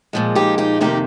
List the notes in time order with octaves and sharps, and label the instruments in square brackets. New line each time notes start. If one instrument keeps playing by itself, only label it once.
[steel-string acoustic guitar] A#2 F3 G#3
D#4 G4
D#4 G4
F2 C3 D#3 A#3 D#4 G4